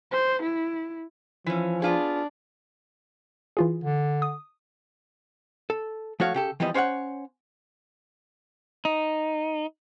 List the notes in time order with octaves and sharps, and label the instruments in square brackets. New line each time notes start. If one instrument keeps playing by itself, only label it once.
[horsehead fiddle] C5
E4
[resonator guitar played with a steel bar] E3 C#4 [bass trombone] F3
[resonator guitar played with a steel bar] B3 F4 G#4 [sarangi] D4
[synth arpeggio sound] E3 F4 G#4
[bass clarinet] D3
[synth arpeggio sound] D#6
[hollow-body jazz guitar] A4
F3 A3 F#4 C#5 F5
C#3 G4 A4
E3 F3 G3 B3 D#5
C#4 C5 C#5 F5 F#5
[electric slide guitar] D#4